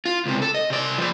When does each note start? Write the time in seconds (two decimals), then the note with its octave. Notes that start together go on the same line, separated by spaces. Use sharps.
0.05 F4
0.25 C#2 C3
0.42 A4
0.54 D#5
0.70 C3 D5
0.98 F3 D5